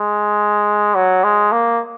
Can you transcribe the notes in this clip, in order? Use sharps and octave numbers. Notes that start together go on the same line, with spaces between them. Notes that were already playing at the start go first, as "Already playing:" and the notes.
Already playing: G#3
F#3
G#3
A#3